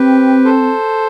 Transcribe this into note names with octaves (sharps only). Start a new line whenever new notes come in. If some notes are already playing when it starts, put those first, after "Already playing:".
Already playing: C4 G4 B4
A4 C5